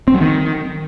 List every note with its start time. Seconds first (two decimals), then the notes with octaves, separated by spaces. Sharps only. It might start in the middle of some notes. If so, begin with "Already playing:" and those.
0.08 C4
0.14 F#3
0.21 D#3